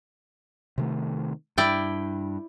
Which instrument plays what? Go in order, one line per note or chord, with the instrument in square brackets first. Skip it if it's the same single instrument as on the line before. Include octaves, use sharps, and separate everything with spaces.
[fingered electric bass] C3 D#3 A3
[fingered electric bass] G2 [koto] E4 D5 G5